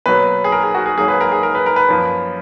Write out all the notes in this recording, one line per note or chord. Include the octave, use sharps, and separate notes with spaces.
B2 F#3 A#3 B4
G#4
A#4
G#4
F#4
G#4
G#2 F#3 A#3 G#4
B4
A#4
G#4
A#4
B4
A#4
B4
F#2 F3 A#3